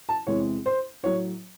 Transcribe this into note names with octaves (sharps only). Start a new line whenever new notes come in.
A5
E2 C3 E3 G#3 C#5
C5
A2 F#3 C#5